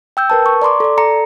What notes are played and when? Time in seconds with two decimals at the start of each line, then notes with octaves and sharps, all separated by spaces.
0.17 G5 E6 G6
0.30 A#4 B4 A5
0.46 C#6
0.62 D5 A#5 C6 D6
0.80 A4 D5
0.98 A4 A#5 C#7